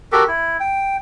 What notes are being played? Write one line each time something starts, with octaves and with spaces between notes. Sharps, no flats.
F#4 G4 A4 A#4
E4
G5